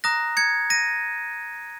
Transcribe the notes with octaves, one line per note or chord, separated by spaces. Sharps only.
A#5 D#6 F#6 A#6
G#6 C#7
A#6 D#7